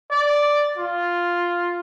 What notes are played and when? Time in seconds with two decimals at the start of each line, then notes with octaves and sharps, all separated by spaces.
0.11 D5
0.77 F4